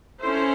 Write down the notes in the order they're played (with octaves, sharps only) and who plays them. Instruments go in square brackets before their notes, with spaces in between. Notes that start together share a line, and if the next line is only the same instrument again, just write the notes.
[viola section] C#4 E4 A4 C5